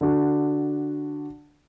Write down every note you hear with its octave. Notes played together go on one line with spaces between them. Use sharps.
D3 D4 F#4